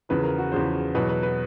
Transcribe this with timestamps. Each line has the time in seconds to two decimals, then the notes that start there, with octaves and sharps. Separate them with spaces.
0.09 E2 C#3 F3 B4
0.23 A#4
0.38 F#4
0.52 E2 C#3 F3 C5
0.95 E2 B2 F#3 B4
1.09 B4
1.23 B4